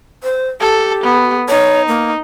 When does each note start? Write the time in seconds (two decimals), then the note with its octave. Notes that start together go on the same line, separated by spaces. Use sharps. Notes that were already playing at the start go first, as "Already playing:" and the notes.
0.23 C5
0.61 G4 A4
1.04 B3
1.49 D#4 C#5
1.88 A#3